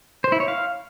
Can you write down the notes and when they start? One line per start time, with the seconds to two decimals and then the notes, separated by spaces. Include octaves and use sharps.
0.24 C5
0.32 E4
0.40 C#5
0.48 F5